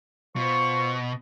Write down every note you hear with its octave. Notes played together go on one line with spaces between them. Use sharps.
B2 F4 C5 C#6